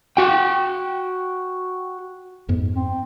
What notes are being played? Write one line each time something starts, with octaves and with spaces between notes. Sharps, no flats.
F#4 G5
F2 G#2 B3
C4